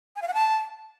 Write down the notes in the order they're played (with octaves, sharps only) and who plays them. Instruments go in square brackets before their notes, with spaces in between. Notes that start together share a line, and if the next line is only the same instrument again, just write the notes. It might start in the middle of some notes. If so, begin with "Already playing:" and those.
[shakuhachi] G#5
F5
F#5
A5